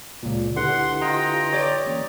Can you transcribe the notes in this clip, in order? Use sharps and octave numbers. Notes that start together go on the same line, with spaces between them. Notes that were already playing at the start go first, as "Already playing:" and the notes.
C#2 A#2 D5
D3 E4 G4 B4 F#5 C6
F4 D#5 G5 A#5
G4 C#5 D5
E3 A#3 C#4